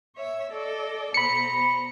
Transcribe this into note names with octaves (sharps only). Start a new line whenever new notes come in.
C#5 E5 E6
A4 D5 D#5
B2 C5 A#5 B5 C#7